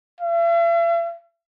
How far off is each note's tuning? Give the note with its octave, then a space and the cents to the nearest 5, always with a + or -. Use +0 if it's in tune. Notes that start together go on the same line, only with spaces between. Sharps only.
E5 +45